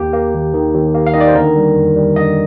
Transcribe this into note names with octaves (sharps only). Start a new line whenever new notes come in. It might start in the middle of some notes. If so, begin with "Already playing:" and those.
Already playing: D#2 A#3 G4
A#3
D#2
D#3
D#2
A#3
F5
D#3 D#5
D5
C5
D3 A#4
G3
F2
G3
D3 D#5